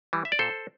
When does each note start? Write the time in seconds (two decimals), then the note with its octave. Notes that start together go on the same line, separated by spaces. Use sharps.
0.13 E3 G3
0.25 E5
0.32 D5
0.39 A#2 A4 C5